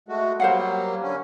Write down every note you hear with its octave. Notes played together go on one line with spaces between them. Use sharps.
G#3 A3 F#4
F#3 G3 A#3 C5 F5 F#5
D3 C#4